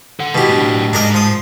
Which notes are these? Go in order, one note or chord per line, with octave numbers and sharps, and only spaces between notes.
A4 F#5
B2 D#3 E4 G4
A2 D4
G#2 D4 A#4 D#5
F3 D#6